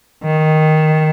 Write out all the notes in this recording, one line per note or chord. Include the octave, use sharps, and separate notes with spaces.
D#3